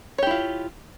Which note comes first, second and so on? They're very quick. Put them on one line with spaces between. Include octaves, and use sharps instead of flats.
C#5 G4 E4 F4